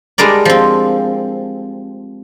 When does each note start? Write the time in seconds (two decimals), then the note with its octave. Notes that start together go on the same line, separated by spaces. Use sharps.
0.18 G3 G#3 D4 A#4 D5
0.45 F3 C4